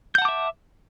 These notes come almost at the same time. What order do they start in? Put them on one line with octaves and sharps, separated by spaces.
G6 F#5 A5 D6 E5